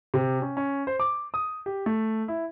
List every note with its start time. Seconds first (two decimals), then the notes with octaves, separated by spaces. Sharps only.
0.14 C3
0.42 C#4
0.57 C#4
0.87 C5
1.00 D6
1.34 D#6
1.66 G4
1.86 A3
2.28 E4